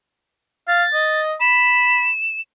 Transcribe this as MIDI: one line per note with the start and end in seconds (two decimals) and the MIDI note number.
0.68 0.84 77
0.68 1.21 93
0.94 1.34 75
1.41 2.08 83
1.41 2.41 100